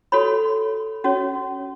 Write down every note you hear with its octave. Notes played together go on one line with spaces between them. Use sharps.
F#4 A4 C#5 B5
C#4 F#4 C#5